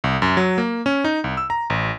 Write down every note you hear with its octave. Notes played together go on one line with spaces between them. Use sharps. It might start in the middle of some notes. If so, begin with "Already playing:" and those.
C2
F#2
F#3
A#3
C#4
D#4
C2
E6
A#5
A1